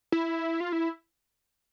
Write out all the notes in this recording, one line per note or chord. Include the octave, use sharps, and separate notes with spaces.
E4
F4
E4